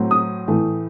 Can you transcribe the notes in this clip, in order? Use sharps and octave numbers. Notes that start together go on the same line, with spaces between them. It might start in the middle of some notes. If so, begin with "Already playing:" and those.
Already playing: A2 F#3 C4
D#6
A2 E3 A3